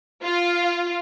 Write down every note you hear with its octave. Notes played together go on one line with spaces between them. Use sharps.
F4